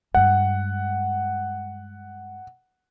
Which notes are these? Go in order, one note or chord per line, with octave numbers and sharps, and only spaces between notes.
G2 G#3 F#5